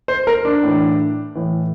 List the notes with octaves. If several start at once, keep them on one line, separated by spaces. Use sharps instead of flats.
C5
A#4
D4
A2 E3
A2 E3